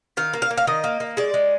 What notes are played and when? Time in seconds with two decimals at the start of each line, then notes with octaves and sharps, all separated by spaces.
0.17 D#3 F5
0.33 A#3
0.42 F5
0.51 A#3
0.57 F5
0.67 D#3 D#5
0.84 A#3
1.00 A#3
1.17 G#3 D5
1.34 G#3